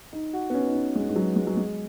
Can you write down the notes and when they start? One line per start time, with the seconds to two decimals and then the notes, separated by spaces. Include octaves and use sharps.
0.13 D#4
0.33 F#4
0.50 B3
0.54 C#4
0.67 D#4
0.75 C#4
0.95 G#3
1.09 G#3
1.16 F#3
1.36 G#3
1.47 F#3
1.57 G#3